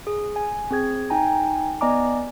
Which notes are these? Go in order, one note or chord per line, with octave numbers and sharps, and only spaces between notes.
G#4
G#5
C4 G#4 G#6
D#4 G5 G#5 A#5
B3 D5 D#5 G#5 A#5 D6